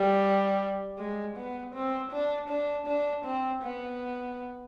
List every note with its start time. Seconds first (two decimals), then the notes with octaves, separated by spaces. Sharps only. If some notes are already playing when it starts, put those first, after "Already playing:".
Already playing: G3
0.98 G#3
1.37 B3
1.74 C4
2.12 D4
2.49 D4
2.87 D4
3.25 C4
3.63 B3